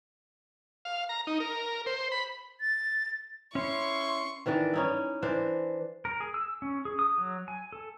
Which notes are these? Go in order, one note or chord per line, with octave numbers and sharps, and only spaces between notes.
F5
A#5
D#4
A#4
C5
B5
A6
C#4 E4 C#5 C6 C#6
D#3 E3 D4 D5
C#4 D#4 E4
E3 D4 C5
A#4
G#4
E6
C#4
G#4
D#6
F#3
G#5
A4